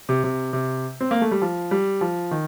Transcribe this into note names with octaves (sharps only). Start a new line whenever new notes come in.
C3
C3
C3
C4
A#3
A3
G3
F3
G3
F3
D#3